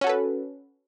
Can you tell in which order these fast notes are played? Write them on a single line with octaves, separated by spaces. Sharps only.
C#4 F#4 A4 B4